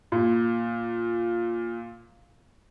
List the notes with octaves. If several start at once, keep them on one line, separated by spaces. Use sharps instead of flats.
A#2